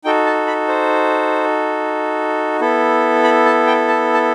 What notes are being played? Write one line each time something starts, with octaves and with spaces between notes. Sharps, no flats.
D#4 F#4 A4 G5
A5
B5
C5
B3 E4 A4
B5
A5
G5
A5
A5